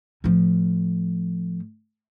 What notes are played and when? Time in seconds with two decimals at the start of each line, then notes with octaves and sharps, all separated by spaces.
0.24 A2 F3